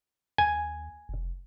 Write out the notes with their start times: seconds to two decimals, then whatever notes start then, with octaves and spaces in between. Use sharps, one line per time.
0.38 D#2 G#5
1.09 F1